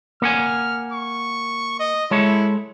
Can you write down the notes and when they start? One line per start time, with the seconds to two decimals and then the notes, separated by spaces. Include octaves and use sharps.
0.22 A#3 F#5 G#5 F6
0.93 C#6
1.80 D#5
2.11 G#3 E4 A4 C#5